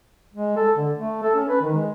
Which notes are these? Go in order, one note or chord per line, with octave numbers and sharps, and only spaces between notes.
G#3
A4
D3
A3
A4
C#4
B4
D#3
G#3